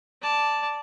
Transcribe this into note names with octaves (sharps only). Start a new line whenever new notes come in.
D5 A5